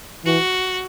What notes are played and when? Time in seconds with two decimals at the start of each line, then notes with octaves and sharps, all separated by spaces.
0.25 E3 F#4